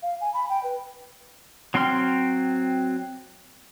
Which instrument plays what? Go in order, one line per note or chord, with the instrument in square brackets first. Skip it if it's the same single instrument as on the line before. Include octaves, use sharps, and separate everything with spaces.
[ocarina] F5
G#5
B5
G5
B4
[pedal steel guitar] F#3 C4 G5 C6 F6